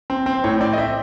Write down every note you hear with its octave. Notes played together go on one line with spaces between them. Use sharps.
C4
C4
C5
A2 C#5
C4 D5
D#5
C4 E5